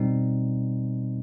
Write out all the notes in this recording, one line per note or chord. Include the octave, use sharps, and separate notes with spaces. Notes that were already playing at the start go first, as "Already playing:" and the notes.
Already playing: B2 G3 C4 D#4